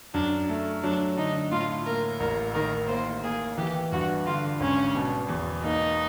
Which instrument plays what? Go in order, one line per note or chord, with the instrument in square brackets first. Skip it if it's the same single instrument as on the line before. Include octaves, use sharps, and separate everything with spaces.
[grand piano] F#2 [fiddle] D4
[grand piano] A3
[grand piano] F#3 [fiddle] D4
[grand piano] D3 [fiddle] D#4
[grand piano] A2 [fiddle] F4
[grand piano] A#3 [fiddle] A#4
[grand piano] A1 [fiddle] A#4
[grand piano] D#3 [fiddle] A#4
[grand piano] A#3 [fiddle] C5
[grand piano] A#3 [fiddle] G#4
[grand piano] E3 [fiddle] G4
[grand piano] G2 [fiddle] F#4
[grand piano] D3 [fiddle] F4
[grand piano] G#1 [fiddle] C#4
[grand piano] B2
E2
[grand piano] A#3 [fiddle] D#4